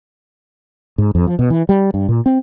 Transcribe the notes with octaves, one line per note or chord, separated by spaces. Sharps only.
G#2
F2
F3
B2
E3
G3
G2
A#2
C4